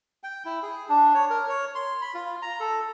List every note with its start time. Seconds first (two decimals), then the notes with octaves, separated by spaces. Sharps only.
0.23 G5
0.46 E4
0.63 G#4
0.89 D4
1.15 C#5
1.30 A#4
1.49 C#5
1.75 C6
2.01 B5
2.14 F4
2.42 A#5
2.60 A4